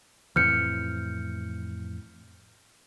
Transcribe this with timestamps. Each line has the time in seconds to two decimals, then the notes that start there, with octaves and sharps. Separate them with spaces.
0.36 F2 A2 E3 F6 G6 C#7